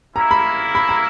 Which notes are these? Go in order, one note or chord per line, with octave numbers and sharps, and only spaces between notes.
A#3 C#4 E4 A#5
B5
B5
A#5